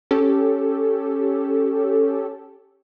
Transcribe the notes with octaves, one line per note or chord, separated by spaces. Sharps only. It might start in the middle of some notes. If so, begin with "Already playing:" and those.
C#4 G4 A4